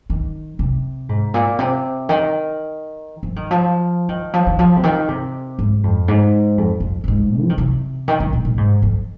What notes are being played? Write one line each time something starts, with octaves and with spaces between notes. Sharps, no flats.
D#3
C3
G#2
A#2
C3
D#3
F3
D#3
F3
D#3
F3
D#3
F3
C3
D#3
C3
G#2
F2
G#2
F2
F2
F2
G#2
F3
D#3
C3
D#3
D#3
A#2
A#2
G#2
F2